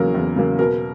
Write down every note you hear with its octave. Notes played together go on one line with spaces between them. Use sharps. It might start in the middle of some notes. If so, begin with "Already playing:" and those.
Already playing: E2 C#3 F#3 A#3 A#4
E2
C#3 F#3 A#3
B2 A#4